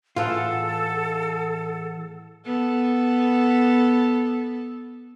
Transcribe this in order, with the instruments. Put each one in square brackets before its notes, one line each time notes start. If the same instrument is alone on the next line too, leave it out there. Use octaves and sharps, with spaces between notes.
[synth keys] A2 G#4 F#5 [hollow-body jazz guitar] E3 F4 [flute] A4
[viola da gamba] B3 A4